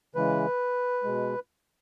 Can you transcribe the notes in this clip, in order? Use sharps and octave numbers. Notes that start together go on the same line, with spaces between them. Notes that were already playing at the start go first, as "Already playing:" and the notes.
C#3 E3 G#3 B4
B2 G#3